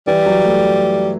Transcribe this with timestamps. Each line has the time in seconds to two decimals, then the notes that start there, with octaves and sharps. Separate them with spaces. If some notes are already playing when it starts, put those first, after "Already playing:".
0.07 E3 G3
0.26 F#3
0.45 A3